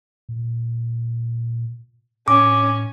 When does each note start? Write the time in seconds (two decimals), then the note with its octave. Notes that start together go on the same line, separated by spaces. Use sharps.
0.29 A#2
2.28 A2 C#4 D6